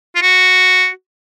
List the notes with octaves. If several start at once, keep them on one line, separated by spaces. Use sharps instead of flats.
F4
F#4